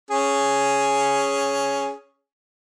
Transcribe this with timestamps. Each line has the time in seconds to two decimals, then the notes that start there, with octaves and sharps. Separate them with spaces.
0.11 C#4 G#4